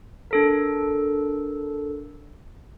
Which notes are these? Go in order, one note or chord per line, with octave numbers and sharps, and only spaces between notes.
D4 A4 A#4